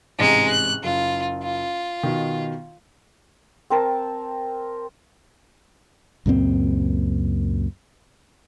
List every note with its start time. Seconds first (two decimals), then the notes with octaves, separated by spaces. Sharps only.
0.19 A1 G#2 C3 G#3 A#5
0.48 F#6
0.84 F#1 F4
1.43 F4
2.03 B2 D#3
3.70 C4 A#4 A5
6.26 C#2 F#2 A#2 C4